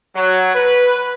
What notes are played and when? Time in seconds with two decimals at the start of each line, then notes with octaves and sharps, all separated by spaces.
0.16 F#3
0.55 B4